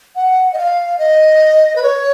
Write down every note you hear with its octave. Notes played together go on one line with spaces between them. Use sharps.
F#5
D#5
F5
D#5
B4
C#5